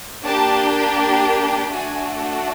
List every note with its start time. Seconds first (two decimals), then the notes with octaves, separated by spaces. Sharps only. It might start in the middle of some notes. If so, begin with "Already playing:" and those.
0.25 A#3 D4 G4 A5
1.72 A3 D4 F#4 G#5